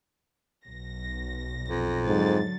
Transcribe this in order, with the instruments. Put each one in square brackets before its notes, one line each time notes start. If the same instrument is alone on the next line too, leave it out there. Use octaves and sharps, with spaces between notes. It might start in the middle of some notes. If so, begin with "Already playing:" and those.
[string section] B1 A#6
[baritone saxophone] F2
[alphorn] G#2 [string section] D3 F#3 A6